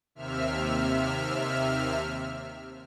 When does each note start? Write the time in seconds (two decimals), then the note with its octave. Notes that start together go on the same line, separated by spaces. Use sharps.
0.15 D#2 C3 E5 F6